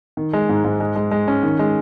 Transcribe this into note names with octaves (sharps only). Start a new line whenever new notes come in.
D#3
G#3
G#2
G#2
G#3
G#3
G#3
C#4
D#3
G#3